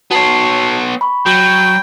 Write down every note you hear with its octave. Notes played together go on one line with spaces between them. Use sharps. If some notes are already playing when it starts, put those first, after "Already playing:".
B3 F#4 C#5 A5 C7
B5 C#6
F#3 G5